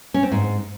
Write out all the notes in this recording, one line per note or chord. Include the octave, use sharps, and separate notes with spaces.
C#4
C4
G#2